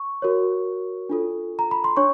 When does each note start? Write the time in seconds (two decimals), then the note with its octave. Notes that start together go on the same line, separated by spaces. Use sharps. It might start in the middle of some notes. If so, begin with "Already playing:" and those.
Already playing: C#6
0.22 F#4 A#4 C#5
1.09 D4 F4 A4
1.59 A#5
1.71 B5
1.84 C6
1.97 D4 C#5 C#6